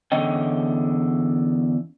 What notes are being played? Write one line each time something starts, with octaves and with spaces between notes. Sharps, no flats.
E2 D3 C#4 D#5 G5